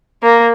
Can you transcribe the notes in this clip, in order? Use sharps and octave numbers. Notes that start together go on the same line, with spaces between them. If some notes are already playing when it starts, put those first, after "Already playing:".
A#3